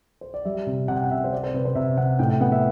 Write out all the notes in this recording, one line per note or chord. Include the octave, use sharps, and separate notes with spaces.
C5
D5
G3 E5
C3
C3 F#5
G5
F#5
C3 E5
C5
C4 D5
C5
C3 B4
C5
C3 E5
C3 F#5
A2 G5
G5
B3 F#5
E5